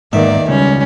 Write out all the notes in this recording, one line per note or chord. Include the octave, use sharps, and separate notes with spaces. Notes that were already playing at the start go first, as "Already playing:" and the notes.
E2 G#2 D#3 A#3 D5 E5
C#2 G3 C#4